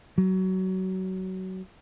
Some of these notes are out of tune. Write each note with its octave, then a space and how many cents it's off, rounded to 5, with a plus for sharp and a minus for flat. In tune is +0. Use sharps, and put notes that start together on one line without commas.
F#3 +20